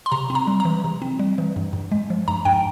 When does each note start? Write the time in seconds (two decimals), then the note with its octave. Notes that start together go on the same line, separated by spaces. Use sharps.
0.06 C6
0.12 C3 A#5
0.30 C4
0.35 A#5
0.47 G3
0.60 A#5
0.65 E3
0.84 C3
1.02 C4
1.19 G3
1.38 E3
1.56 G2
1.73 G2
1.92 G#3
2.10 F3
2.28 G2 A#5
2.45 G2 G5